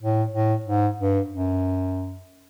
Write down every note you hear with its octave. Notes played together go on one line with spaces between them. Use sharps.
A2
A2
G#2
G2
F#2